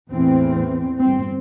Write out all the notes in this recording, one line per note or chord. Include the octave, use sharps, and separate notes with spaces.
E2 A2 E3 C4
G1 C4